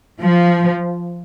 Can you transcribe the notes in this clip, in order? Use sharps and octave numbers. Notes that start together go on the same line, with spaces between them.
F3